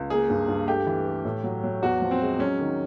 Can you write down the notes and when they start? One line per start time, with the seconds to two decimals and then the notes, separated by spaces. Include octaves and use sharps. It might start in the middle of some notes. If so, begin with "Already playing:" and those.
Already playing: C#2
0.10 A#3 G#4
0.30 G2
0.48 G2
0.67 A3 G4
0.87 E3
1.05 A3
1.25 A2
1.44 F#3
1.64 F#3
1.82 E2 F#4
2.02 F3
2.11 C4
2.21 G#3
2.39 F#3 C#4
2.59 D#3